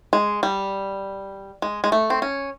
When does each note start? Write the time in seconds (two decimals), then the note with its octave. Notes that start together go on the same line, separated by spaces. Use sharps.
0.13 G#3
0.43 G3
1.62 G#3
1.84 G#3
1.92 A3
2.10 C4
2.22 C#4